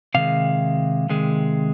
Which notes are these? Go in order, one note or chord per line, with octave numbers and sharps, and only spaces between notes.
C3 D#3 G#3 F5
C3 D#3 G#3